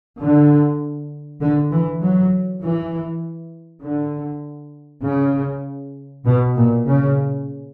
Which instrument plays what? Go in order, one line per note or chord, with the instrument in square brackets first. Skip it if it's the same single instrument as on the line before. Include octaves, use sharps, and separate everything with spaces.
[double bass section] D3
D3
E3
F#3
E3
D3
C#3
B2
A#2
C#3